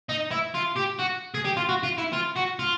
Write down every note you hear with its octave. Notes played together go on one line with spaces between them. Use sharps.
D#4
E4
F4
G4
F#4
G#4
G4
F4
F#4
F4
E4
F4
F#4
F4